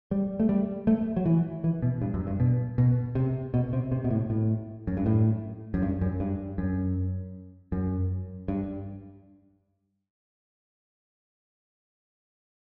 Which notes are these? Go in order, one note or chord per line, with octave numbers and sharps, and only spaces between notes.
G3
A3
G3
A3
F#3
E3
E3
B2
G2
F#2
G2
B2
B2
C3
B2
C3
C3
B2
A2
A2
F#2
G2
A2
F#2
G2
F#2
G2
F#2
F#2
G2